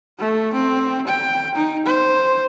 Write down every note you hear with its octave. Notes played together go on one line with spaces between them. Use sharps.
A3
C4
G5
D#4
C5